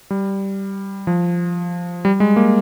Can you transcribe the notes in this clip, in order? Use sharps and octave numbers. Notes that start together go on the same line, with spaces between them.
G3
F3
G3
G#3
A#3